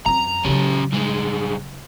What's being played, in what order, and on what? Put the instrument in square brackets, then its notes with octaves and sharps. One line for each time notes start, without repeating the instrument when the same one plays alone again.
[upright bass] F#2 C4 [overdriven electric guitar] A#5
[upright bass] C#3 F#3 [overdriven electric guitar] C#4 G4
[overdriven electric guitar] G2 G#3